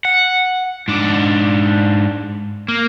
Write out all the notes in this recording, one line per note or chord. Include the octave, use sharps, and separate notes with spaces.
F#5
G#2 D4
A#3